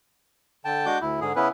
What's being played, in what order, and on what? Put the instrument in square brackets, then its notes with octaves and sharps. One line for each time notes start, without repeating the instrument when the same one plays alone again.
[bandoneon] D3 G5 A5
G#3 D4 F#4 D6 G6
D2 E4
G#2 D3 G#4
C#3 B3 C#4 E4 B4